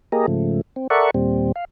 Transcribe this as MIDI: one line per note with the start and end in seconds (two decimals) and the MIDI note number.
0.12 0.26 58
0.12 0.26 67
0.12 0.26 68
0.12 0.26 70
0.12 0.26 75
0.27 0.61 44
0.27 0.61 49
0.27 0.61 53
0.27 0.61 57
0.76 0.87 60
0.90 1.10 69
0.90 1.10 70
0.90 1.10 74
0.90 1.10 76
0.90 1.10 78
0.90 1.10 85
1.14 1.52 39
1.14 1.52 46
1.14 1.52 55
1.14 1.52 60
1.56 1.65 77